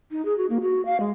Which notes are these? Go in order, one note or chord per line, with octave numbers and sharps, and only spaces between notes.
D#4
G#4
F#4
A#3
F#4
F5
G#3